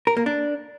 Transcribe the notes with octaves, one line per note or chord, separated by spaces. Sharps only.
A#4
A#3
D4